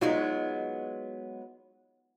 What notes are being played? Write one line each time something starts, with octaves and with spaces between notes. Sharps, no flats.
F#3 G#3 B3 D#4 F4 F#4